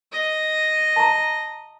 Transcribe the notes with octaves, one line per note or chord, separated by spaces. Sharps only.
D#5
A5 A#5